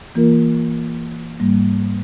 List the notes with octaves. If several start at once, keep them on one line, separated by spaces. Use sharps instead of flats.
E3 A#3 F4 A#4
G#2 G3 A#3